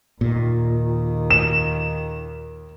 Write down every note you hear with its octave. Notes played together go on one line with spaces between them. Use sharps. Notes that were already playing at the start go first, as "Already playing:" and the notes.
D#2 A#2 D#3
E7